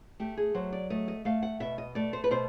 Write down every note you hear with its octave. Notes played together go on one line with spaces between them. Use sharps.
A3 G4
G#4
F#3 C5
D5
A3 D#5
D#5
A3 F5
F#5
B2 E5
D#5
A3 D5
C5
B4
B2 C5